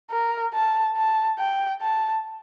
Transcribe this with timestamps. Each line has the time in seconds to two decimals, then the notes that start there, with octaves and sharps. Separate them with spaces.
0.11 A#4
0.54 A5
0.97 A5
1.39 G5
1.82 A5